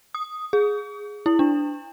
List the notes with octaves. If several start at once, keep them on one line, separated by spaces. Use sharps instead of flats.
D#6
G#4
E4
D4